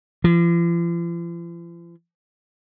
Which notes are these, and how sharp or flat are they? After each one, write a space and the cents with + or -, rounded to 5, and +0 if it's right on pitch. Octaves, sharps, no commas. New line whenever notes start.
F3 -45